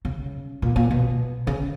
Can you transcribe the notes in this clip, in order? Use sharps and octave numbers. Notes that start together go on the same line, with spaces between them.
C#3
A#2
A#2
B2
C#3